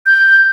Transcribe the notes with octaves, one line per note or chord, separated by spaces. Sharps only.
G6